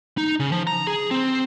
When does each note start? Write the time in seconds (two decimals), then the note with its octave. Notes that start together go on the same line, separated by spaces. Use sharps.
0.18 D#4
0.40 C#3
0.52 F3
0.67 A#5
0.87 G#4
1.11 C4